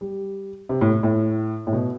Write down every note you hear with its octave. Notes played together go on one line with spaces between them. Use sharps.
G3
C3
A2
A2
A2
B2